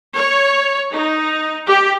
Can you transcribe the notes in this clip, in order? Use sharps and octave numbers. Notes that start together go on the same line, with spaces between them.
C#5
D#4
G4